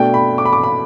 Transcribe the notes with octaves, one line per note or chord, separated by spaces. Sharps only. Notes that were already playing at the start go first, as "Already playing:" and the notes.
Already playing: B2 A3 D4 G5
B5
D6
B5
D6
B5